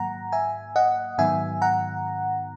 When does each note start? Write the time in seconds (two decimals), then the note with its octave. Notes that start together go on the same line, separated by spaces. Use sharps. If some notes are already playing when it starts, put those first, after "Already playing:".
Already playing: G#2 D#3 F#3 A#3 F#5 A#5
0.32 E5 G#5
0.76 D#5 F#5
1.18 G#2 D#3 F#3 B3 E5 G#5
1.62 F#5 A#5